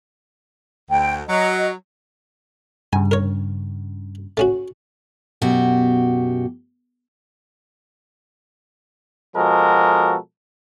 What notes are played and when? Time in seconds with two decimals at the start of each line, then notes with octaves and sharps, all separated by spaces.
0.91 D2 G5
1.29 F#3 D#5
2.93 G2 C#3 G#5
3.11 A#4 C#5
4.37 A3 C#4 F#4
5.42 F#2 B2 F#4 G4
9.36 B2 F3 G#3 F#4 A4 A#4